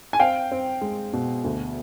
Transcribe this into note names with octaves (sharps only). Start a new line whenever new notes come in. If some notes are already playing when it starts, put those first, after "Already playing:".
G#5
C4 F5 G5
C4
G#3
B2
D2